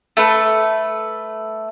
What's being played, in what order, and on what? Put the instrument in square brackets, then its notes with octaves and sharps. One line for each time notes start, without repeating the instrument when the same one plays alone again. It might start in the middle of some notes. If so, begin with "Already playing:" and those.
[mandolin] A3 B4